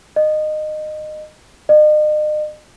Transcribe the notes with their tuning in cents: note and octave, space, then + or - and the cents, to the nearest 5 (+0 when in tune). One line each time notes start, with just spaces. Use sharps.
D#5 -20
D#5 -40